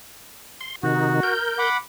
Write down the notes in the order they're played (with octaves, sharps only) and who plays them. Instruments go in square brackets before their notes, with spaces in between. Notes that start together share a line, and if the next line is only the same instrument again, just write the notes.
[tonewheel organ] C6
[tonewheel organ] C3 D#3 D#4 [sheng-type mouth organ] F#4
[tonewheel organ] A#4 G6
[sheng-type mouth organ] F#5 B5 D6